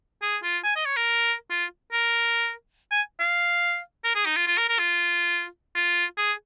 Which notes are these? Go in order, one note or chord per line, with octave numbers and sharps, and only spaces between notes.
G#4
F4
G#5
D#5
C#5
A#4
F4
A#4
G#5
F5
A#4
G#4
D#4
F4
F4
A#4
A#4
F4
F4
G#4